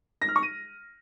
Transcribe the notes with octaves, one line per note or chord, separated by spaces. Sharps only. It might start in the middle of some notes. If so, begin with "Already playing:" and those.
A#6
F6
C#6
D#7